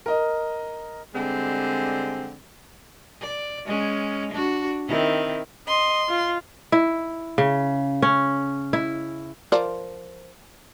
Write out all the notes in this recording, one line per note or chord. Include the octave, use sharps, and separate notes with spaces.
A#4 D#5
D3 G3 G#3 C4
D5
G#3 C#4
D4 F#4
D#3 C4 E4
D#5 C6
F4
E4
C#3
C#4
E4
F3 A#4 D5